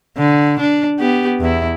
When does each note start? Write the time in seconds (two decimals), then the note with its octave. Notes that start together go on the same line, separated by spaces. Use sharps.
0.18 D3
0.60 D4
0.99 B3 G4
1.40 E2 E4